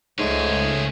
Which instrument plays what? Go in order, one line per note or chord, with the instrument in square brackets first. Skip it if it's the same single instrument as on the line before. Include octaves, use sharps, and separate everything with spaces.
[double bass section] C#2 [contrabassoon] G#2 [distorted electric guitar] F3 G#4 [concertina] A3 C#5